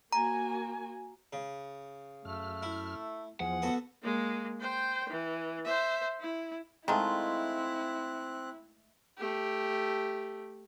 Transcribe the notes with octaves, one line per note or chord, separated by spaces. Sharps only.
A#3 F#4 G#5 A#5
C#3
F#2 A3 F6
E4
E2 F3 G#4 F#5
B3 F#4 A4
G#3 A#3
C5 G5
E3
C5 E5
E4
D#3 G#3 A3 C4 E4 F4 F#6
A3 G4